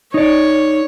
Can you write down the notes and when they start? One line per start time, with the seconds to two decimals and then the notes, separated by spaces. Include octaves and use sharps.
0.14 D#4 C#5 D5